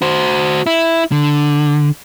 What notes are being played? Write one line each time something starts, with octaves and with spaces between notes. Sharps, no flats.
F#4 C5
E4
D3